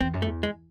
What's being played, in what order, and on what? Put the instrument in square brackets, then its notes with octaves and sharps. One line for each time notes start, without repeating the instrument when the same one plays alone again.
[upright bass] E2 [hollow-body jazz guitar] C4
[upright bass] F#2
[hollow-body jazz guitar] A3
[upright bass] E2
[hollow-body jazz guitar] G#3